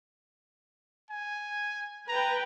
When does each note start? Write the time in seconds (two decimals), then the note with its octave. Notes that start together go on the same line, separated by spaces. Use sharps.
1.10 G#5
2.08 B4 G5 A#5